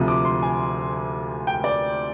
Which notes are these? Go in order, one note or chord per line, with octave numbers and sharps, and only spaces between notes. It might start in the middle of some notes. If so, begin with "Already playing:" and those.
Already playing: D2 C3 F3 C4
D6
C6
G#5
G5
D5